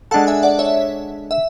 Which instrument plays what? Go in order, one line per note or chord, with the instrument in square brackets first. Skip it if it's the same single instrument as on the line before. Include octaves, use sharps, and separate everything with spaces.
[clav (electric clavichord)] G#3 D4 A4 [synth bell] F#5 A5
[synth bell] E5 G#5
D5 F#5
C#5 E5
E5